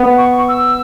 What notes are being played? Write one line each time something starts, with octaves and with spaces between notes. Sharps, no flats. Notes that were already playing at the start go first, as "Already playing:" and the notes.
Already playing: B3
C#6
E6